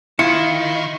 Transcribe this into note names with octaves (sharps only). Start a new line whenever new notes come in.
D#3 E4 F4 C#7